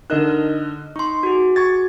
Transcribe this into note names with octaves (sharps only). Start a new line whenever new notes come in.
D3 D#4 A#4 D#5 F#6
F6
D#4 C6 C#6
F#4 G#4
C#6 G#6 A6